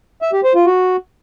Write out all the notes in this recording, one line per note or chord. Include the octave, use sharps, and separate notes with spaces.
E5
G4
C5
F4
F#4